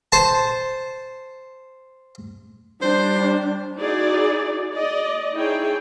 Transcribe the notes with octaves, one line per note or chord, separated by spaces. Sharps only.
C5 A5
G3 D4 C5
D#4 E4 F#4 G#4 D5
D5 D#5
D#4 E4 G#4 C#5 G5